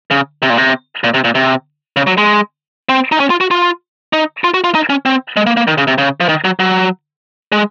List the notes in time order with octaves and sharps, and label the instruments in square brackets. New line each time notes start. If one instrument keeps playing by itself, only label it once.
[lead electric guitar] C#3
C3
A#2
C3
A#2
C3
A#2
C3
C#3
F#3
G#3
C4
D#4
C#4
F4
F#4
F4
D#4
F4
F#4
F4
D#4
C#4
C4
G#3
A#3
A#3
D#3
C#3
C3
C#3
F3
D#3
F#3
F#3
G#3